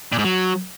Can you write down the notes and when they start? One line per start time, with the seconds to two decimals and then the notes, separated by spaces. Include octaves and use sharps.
0.12 A#2
0.18 G#2
0.25 F#3